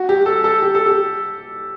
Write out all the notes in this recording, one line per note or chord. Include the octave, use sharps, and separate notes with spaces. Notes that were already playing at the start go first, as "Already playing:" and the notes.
Already playing: F#4
G4
A4
A4
G4
A4
G4